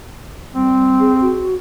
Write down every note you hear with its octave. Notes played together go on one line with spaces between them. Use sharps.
G3 C4
G#4
F#4